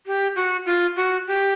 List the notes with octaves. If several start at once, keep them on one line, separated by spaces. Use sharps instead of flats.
G4
F#4
F4
F#4
G4